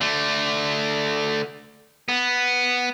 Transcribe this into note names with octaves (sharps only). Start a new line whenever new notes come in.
D3 A3
B3